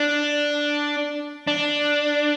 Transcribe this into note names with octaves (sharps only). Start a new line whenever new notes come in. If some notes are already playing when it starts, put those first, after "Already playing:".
Already playing: D4
D4